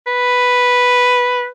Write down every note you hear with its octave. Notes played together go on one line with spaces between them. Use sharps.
B4